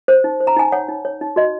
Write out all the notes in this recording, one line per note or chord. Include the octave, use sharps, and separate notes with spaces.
C5
D#4
C5
A#5
D#4 G#5
C#5 F#5
D#4
C#5
D#4
F#4 D#5